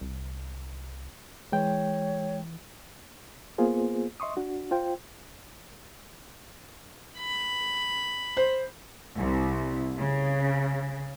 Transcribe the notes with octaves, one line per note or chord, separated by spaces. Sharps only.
C2
E3 G#3 C#5 G5
A#3 B3 F4 G#4 C5
D#5 E5 C6 C#6 D#6
D4 F#4
F4 C5 G5
B5
C5
C2
C#3